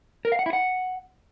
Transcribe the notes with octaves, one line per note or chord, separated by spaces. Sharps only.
A#4
F5
F#5
E4
F#5